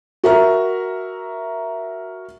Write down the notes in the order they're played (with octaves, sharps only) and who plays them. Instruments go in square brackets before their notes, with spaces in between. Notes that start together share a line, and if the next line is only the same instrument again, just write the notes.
[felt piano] F#4 A#4 E5 A#5